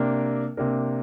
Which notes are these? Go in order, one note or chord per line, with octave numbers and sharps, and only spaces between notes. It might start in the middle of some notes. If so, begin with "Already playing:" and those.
Already playing: C3 A#3 D4 A#4
C3 A#3 D4 A#4